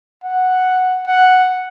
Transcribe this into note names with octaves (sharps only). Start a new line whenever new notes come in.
F#5
F#5